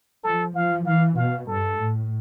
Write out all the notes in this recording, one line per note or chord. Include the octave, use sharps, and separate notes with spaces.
F3 A4
F3 F5
E3 F5
B2 F5
G2 A4
A2